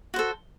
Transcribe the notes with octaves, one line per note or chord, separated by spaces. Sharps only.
F#4 A4 C5